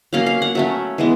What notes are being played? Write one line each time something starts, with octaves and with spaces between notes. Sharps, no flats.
F#3 A#3 C#4 F5
F5
F#5
F#3 A3 C#4 E5
E3 G#3 B3